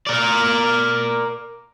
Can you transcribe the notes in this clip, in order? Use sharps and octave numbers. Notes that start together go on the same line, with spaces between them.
A#4 D5